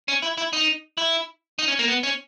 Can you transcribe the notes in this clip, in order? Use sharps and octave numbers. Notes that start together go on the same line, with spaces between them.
C#4
E4
E4
D#4
E4
D#4
C#4
A#3
B3
C#4